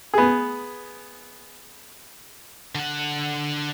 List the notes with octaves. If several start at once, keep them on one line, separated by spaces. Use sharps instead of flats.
B3 G#4
D3 F#5